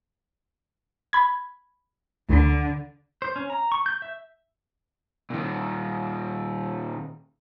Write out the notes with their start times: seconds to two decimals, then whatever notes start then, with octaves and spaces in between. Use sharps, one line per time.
1.13 B5 G#6
2.29 D2 D3
3.22 C5
3.36 C#4
3.50 A#5
3.72 C#6
3.86 G6
4.02 E5
5.30 A#2 D#3